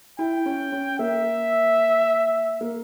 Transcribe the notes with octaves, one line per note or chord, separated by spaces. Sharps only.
E4 G5
C#4
C#4
A#3 E5
A#3